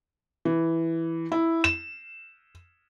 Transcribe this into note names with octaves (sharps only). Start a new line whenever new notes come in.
E3
E4
E7